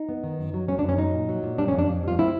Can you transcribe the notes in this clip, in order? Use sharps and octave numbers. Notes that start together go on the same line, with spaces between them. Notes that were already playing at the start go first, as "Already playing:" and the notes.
Already playing: D#4
B3
D#3
F#2
F#3
F#3 C#4
D4
F#2
C#4
F#3 D#4
A#2
F#3
A#2
G3 D4
C#4
F2 D4
F2
G3 F4
C4 E4